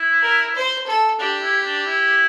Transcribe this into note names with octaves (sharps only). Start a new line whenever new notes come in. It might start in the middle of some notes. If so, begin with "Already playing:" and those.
Already playing: E4
A#4
C5
A4
D4 G4
E4
D4
E4